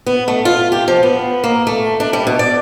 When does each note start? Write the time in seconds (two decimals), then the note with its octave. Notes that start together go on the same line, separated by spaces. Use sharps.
0.06 B3
0.28 A3
0.45 F4
0.72 G4
0.88 F3
1.03 B3
1.44 A#3
1.67 A3
2.00 D4
2.13 G3
2.27 B2
2.39 D5